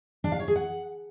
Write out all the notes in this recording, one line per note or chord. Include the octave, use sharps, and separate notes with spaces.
D4
F5
C#5
G#4
F#5